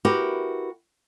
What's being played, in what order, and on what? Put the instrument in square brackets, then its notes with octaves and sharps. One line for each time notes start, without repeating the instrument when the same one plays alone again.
[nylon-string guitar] E4 F#4 G4 A#4 B4